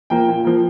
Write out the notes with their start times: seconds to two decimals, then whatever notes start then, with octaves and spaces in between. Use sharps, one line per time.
0.10 F3 A#3 G5
0.28 A#2
0.45 F3 A#3